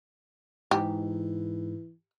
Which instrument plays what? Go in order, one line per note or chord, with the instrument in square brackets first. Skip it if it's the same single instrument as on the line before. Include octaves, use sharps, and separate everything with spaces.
[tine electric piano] G#2 [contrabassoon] E3 [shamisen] G4